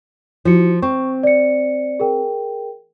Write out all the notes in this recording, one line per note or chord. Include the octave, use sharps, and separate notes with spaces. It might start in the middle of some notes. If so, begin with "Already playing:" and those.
F3 E4 F#4 C#7
C4 C#6
D5 C#7
G#4 A#4 G5